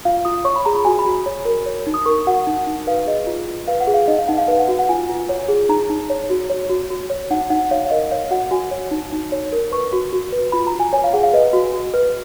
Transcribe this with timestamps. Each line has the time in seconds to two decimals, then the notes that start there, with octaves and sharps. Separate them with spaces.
0.05 F4 F5
0.25 F4 D#6
0.45 C#5 C#6
0.56 B5
0.65 G#4 A#5
0.75 B5
0.85 F#4 G#5
0.99 B5
1.06 F#4
1.12 B5
1.26 C#5
1.45 A#4
1.66 C#5
1.87 D#4
1.94 D#6
2.06 A#4 C#6
2.27 F#4 F#5
2.47 D#4
2.67 D#4
2.87 B4 F5
3.07 G#4 D#5
3.27 F4
3.48 F4
3.68 B4 F5
3.80 F#5
3.87 G#4
3.94 F5
4.08 D#4 D#5
4.18 F5
4.28 D#4 F#5
4.38 F5
4.48 B4 F5
4.59 F#5
4.68 F#4
4.79 F#5
4.89 F4 G#5
5.09 F4
5.29 C#5
5.48 G#4
5.69 D#4 A#5
5.90 D#4
6.10 C#5
6.30 F#4
6.50 C#5
6.69 F#4
6.90 F#4
7.10 C#5
7.30 D#4 F#5
7.50 D#4 F#5
7.71 C#5 F5
7.87 F5
7.90 A#4 D#5
8.11 C#5 F5
8.31 F#4 F#5
8.51 F#4 G#5
8.71 C#5
8.91 D#4
9.12 D#4
9.32 C#5
9.52 A#4
9.72 B4 C#6
9.93 F#4
10.13 F#4
10.33 B4
10.52 F4 B5
10.67 A#5
10.72 F4
10.80 G#5
10.93 C#5 G#5
11.04 F5
11.13 G#4 F#5
11.23 F5
11.33 B4 D#5
11.53 F#4
11.73 F#4
11.94 B4